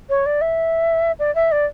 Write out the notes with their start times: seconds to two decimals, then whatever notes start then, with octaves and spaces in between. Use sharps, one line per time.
0.10 C#5
0.26 D5
0.41 E5
1.19 D5
1.35 E5
1.52 D5